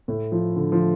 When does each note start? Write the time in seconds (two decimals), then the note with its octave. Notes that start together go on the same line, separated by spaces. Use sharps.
0.08 A2
0.32 F3
0.56 D3
0.72 F3